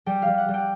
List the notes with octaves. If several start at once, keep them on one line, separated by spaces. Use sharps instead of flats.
G3 G5
F5
G3
F#5
G3
G5